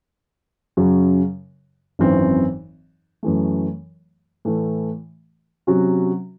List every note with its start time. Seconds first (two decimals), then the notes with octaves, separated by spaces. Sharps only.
0.77 F#2 C#3 F#3
1.99 G#1 F#2 E3 C4
3.23 F#2 E3 A3
4.45 A2 E3 A3
5.67 C3 F#3 C#4 F#4